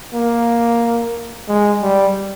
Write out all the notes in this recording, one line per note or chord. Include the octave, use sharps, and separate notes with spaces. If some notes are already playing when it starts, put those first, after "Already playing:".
A#3
G#3
G3